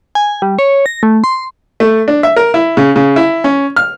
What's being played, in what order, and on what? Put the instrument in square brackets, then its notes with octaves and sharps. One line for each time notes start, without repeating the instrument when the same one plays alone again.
[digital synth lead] G#5
G3
C#5
A#6
A3
C6
[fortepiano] A3
D4
E5
A#4
E4
C#3
C#3
E4
C#4
F6